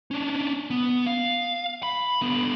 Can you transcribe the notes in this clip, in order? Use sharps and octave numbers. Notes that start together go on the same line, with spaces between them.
C#4 D4
B3
F5
B5
D3 B3